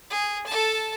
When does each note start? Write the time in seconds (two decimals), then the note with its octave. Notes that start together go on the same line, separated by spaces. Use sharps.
0.10 G#4
0.47 A4 A5